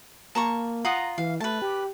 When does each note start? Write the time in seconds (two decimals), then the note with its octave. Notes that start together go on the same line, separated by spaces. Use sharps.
0.35 A#3 A5 A#5 C#6
0.85 F4 F#5 A#5 D#6
1.18 E3 F5
1.40 A3 B4 A5
1.62 G4